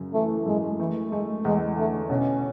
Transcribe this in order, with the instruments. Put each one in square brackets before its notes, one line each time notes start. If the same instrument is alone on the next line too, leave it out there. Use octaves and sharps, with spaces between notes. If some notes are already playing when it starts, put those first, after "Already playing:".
Already playing: [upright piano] F#2 C#3
[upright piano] E3 [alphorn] A3
[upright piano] F#2 [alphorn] G#3
[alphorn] E3 [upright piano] A3
[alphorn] G#3 [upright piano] A3
[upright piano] E2 [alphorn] G#3
[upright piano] D3 [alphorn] A3
[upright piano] B2 [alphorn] C#4